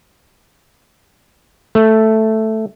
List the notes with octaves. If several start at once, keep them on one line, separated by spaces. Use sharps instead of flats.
A3